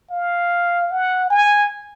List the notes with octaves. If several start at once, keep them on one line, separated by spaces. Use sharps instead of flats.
F5
F#5
G#5